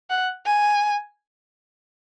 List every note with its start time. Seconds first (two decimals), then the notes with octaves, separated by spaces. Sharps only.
0.10 F#5
0.46 G#5